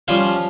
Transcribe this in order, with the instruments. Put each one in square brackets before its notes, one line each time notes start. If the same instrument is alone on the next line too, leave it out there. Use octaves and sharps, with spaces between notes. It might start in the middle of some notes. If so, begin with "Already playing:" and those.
[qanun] F3 [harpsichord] G3 C#4 F4 C5